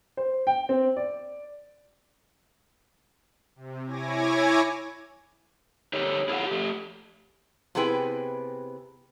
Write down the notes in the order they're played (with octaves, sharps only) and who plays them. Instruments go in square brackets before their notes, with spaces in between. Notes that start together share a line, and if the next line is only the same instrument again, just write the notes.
[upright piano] C5
G5
C4
D5
[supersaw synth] C3
E4 C#5 G#5 D6 G#6 A#6
[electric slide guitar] D#4 G4 A4 C#5
E4 F4 G#4 A4 F5 F#5
A3 G4
[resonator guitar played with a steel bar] C3 B3 E4 G#4 B4 G5